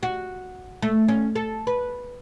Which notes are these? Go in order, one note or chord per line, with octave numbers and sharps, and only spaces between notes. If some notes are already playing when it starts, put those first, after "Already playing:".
F#4
A3
C#4
A4
B4